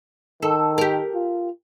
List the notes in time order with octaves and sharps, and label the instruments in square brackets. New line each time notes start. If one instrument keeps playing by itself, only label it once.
[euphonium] D#3 [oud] A4
[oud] G4 A#4
[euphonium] F4